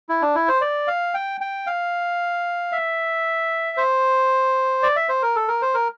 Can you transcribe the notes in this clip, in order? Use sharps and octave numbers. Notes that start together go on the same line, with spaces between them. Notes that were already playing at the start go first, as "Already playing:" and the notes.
E4
D4
E4
C5
D5
F5
G5
G5
F5
E5
C5
D5
E5
C5
A#4
A4
A#4
C5
A#4